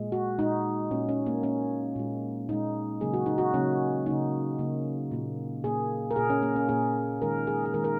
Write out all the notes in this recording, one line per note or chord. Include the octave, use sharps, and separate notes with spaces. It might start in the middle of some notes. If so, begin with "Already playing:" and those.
Already playing: A#2 G#3
F#4
A#2 G#3 D#4
A#2 A#3 C#4
C#4
A#3
A#2 A#3 C#4
A#2 G#3
A#2 G#3 D#4
C#3 F#3 A#3 G#4
F#4
D#4
F#4
C#3 F#3 A#3 C#4
C#3 A#3 D#4
C#3 A#3
A#2 A#3
A#2 A#3 G#4
A#4
A#2 A#3 G#4
C#4
A#3
C#4
A#2 A#3 G#4
D#3 G#3 A#4
G#4
G#4
D#3 G#3 A#4
A#4